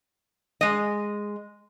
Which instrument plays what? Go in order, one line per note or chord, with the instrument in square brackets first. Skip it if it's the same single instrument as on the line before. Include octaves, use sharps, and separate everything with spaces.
[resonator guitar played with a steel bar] G#3 D#5